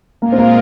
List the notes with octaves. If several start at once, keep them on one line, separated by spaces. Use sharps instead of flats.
A#2 G#3 A#3 F4 A#4
C4
A#3